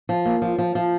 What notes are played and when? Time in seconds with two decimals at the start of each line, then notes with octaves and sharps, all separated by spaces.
0.09 F3
0.25 A#3
0.42 F3
0.58 F3
0.75 F3